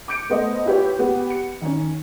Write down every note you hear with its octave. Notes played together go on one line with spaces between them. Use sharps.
D6 G6 C#7 D7
A3 B3 B4 C5 D#5
E4 F4 G4 B4 C#5
B3 G4
C#7
D#3 C#4